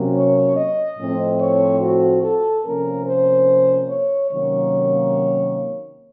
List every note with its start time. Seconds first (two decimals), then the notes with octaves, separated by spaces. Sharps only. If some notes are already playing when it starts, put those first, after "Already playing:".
Already playing: C3 F#3 A#3 C#4
0.16 C#5
0.57 D#5
0.98 A2 F3 A3 C4
1.40 C#5
1.81 F#4
2.23 A4
2.65 C3 F3 A#3 C#4 A#4
3.07 C5
3.90 C#5
4.32 C3 D#3 F#3 A#3 C#4 C#5